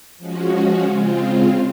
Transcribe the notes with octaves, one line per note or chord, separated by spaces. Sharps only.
F3 G#3 C#4 F#4
C#3 G#3 C4 F4